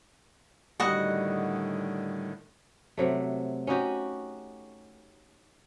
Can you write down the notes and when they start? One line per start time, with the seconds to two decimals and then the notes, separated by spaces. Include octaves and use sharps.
0.80 A2 D3 D#3 G3 F#4 D#5 F#5
2.97 C3 F#3 A3
3.67 C#4 D#4 F#4 G4